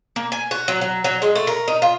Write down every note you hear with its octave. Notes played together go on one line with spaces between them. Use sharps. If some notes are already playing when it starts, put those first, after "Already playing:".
A#3
G#5
F#4
F#3
F#3
F#3
G#3
A3
A#4
D#4
F4